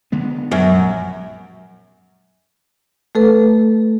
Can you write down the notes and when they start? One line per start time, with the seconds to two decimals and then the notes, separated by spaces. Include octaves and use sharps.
0.12 D3 G#3 B3
0.52 F#2
0.71 A#1
3.15 A3 A4 B4